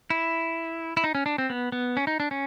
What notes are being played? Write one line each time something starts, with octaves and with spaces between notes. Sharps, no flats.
E4
E4
D#4
C#4
D4
C4
B3
B3
C#4
D#4
D4
C#4